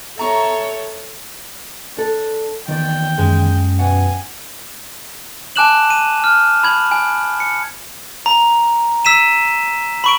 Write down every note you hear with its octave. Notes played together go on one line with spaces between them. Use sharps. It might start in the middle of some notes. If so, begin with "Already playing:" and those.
A4 C#5 E5 A#5 C#6
D4 A4
E2 D#3 F4 D5 G5
F#2 G#3 G#4
B2 F#5 G#5
G#5 A5 D6 F#6 E7 F#7
D#7
F6
B5 G#6 F#7
G#5
C#7
A#5
E6 B6 D#7 E7
B5 C#6 D7